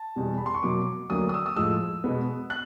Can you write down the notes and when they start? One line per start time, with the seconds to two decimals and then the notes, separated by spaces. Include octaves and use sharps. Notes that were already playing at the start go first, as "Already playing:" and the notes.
Already playing: A5
0.16 E2 B2 G3
0.37 B5
0.46 C6
0.54 C#6
0.63 B2 F#3 A#3 D6
1.10 D2 D3 F#3 A#3 D#6
1.29 D#6
1.34 E6
1.46 D#6
1.56 A2 F3 G#3 E6
2.04 B2 G#3 B3
2.50 F#6